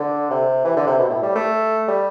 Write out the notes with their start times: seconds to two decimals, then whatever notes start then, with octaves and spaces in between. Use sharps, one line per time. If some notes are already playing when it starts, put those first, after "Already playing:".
Already playing: D3
0.31 C3
0.65 E3
0.77 D3
0.87 C3
0.99 B2
1.09 A2
1.23 G3
1.35 A3
1.88 G3